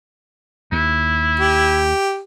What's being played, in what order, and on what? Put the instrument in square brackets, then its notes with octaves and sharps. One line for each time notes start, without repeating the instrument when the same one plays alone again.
[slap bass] D#2 [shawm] E4
[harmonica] G4